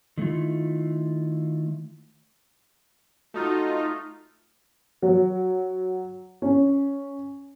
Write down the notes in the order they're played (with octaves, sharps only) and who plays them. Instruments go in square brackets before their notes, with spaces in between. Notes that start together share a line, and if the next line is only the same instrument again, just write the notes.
[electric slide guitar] D#3 A3 E4 F4
[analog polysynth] A3 D#4 F4 [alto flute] F#4
[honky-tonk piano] F#3
C#4